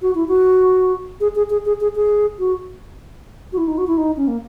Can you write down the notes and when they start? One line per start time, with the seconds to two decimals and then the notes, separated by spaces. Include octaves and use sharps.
0.02 F#4
0.15 E4
0.28 F#4
1.20 G#4
1.35 G#4
1.50 G#4
1.66 G#4
1.81 G#4
1.96 G#4
2.39 F#4
3.53 F#4
3.58 E4
3.68 D#4
3.78 F#4
3.87 E4
3.98 D#4
4.17 C#4
4.28 A#3